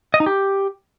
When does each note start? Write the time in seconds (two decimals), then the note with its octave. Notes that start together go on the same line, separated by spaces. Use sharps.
0.14 D#5
0.20 D#4
0.26 G4